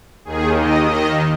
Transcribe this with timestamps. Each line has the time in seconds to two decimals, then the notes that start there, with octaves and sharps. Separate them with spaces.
0.25 D#2 D#3 G#4
0.56 D#5
0.85 D#5